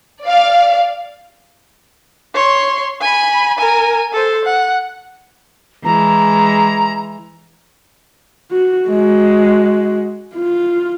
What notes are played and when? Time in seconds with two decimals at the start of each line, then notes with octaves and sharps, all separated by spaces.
0.23 D5 F5
2.34 C#5 C6
3.01 G#5 B5
3.58 A#4 G#5
4.13 A4 C5
4.45 F#5
5.85 E3 G#3 A#5
8.52 F#4
8.88 G#3 F#4
10.36 F4